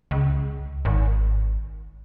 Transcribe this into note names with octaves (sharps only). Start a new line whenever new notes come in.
C#2
G#1